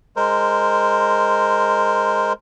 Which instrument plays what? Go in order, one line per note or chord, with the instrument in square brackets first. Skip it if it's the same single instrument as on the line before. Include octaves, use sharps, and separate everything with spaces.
[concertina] G#3 A#4 C5